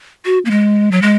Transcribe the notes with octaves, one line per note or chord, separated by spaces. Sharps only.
F#4
A#3
G#3
F#3
G#3